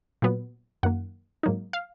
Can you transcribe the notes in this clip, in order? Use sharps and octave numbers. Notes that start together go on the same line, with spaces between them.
A#2 F#3 B3
F#2 D#3 A#3 F#5
G#2 F#3 A#3 D#4
F5